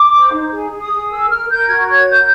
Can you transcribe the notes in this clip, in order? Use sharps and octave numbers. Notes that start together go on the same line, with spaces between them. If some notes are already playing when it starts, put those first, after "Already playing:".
Already playing: D6
C5
D#4
G#4
G#4
D#6
G#4
A#4 E6
A#4 F6
A#4 G6
F#4 G#6
C#5 G#6
A#4 G6